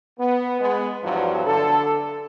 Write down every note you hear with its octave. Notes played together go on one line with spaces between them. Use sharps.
B3
G#3 B3
E2 G2 F3 F#3
D3 A4